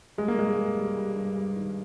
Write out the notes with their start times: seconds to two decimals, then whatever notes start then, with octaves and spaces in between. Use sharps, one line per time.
0.18 G3 G#3
0.28 A#3
0.37 G2 G#3
0.57 G3
0.77 G3
0.96 G3
1.16 G2
1.36 G3
1.56 D#3